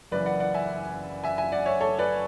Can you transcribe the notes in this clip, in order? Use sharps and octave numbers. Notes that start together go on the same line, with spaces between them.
F#1 F#2 E3 B4 D5
D5 F#5
D5 F#5
E5 G#5
E5 G#5
E5 G#5
D5 F#5
C#5 E5
A4 C#5
B4 D5